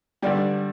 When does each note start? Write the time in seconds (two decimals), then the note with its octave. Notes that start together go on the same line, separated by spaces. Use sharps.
0.22 G2 D3 G3 D5